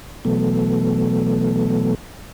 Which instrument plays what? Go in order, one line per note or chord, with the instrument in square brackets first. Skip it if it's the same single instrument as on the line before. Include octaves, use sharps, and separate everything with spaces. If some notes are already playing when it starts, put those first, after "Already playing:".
[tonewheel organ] B2 E3 F#3 A3 B3 A4